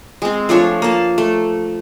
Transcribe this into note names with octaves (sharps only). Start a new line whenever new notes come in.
G#3 C4
F3 A3 D4 C#5
A#3 A5
A3